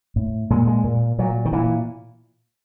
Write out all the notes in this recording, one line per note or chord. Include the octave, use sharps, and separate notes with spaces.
A2
A#2 G#3
G#3
A#2
A#2 F#3
D#3
A#2 E3